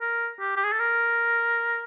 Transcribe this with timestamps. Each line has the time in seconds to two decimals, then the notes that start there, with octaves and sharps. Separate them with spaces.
0.01 A#4
0.40 G4
0.57 G4
0.64 G#4
0.72 A4
0.79 A#4